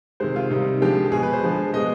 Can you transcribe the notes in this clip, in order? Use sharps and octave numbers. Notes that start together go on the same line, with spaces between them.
C3 D#3 G#3 C5
F4
C3 D#3 G3 D#4
D3 F3 G#3 G4
G4
B2 G#3 G#4
B4
C5
D3 F3 G#3
B2 G#3 D#5